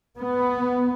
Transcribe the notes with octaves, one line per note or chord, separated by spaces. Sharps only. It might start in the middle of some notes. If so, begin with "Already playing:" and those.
B3